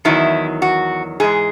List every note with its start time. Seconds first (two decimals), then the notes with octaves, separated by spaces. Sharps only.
0.05 E2 D#3 F#3 E4
0.62 F#4
1.20 G#2 E3 G#3 G#4